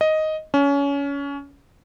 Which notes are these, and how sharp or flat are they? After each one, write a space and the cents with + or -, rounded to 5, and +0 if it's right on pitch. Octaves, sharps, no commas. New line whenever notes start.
D#5 +5
C#4 +25